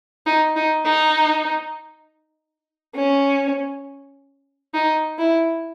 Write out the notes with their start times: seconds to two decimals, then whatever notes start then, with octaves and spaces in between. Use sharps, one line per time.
0.26 D#4
0.56 D#4
0.86 D#4
2.95 C#4
4.74 D#4
5.19 E4